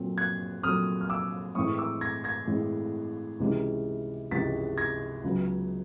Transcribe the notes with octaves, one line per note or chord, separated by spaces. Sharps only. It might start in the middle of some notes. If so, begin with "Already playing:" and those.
Already playing: A#2 F#3 A3 C4
F#6 G#6
A#2 F#3 A3 C4 D#6 F6
F6
D6 E6
A2 E3 G#3 C4 C#6 D#6
D6 E6
G#6 A#6
G#6 A#6
A2 E3 G#3 C4
C#2 C3 E3 G#3 C#4
C#2 C3 E3 G#3 C#4 A6 B6
G#6 A#6
C#2 C#3 F#3 B3